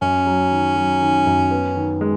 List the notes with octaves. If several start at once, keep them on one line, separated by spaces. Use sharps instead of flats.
F#2 C#4
F#3
D#3
F#3
D#3
F#2
B3
D#3
G#3